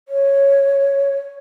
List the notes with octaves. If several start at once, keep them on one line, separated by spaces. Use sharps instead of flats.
C#5